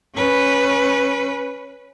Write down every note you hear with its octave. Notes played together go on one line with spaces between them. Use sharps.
C#4 B4